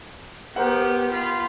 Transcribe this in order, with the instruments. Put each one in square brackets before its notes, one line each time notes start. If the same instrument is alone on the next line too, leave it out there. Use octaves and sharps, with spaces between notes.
[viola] B3 G4 [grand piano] A#4 C5 F#5
[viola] F4 B5